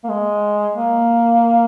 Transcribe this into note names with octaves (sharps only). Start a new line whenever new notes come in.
A#3
G#3
A#3